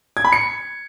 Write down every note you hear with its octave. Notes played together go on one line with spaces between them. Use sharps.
G#6
B5
C#7